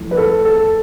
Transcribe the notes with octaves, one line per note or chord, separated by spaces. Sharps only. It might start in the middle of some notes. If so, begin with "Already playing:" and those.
Already playing: F3 A3 E4
B4
A4
A4